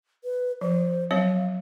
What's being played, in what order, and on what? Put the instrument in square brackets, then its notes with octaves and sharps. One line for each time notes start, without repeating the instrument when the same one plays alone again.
[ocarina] B4
[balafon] F3 [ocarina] C5
[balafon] F#3 C4 C#5 [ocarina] F5